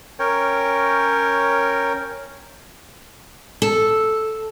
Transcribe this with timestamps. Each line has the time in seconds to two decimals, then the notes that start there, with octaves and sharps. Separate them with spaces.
0.19 C#4 A#4 C#5 G5
3.62 A4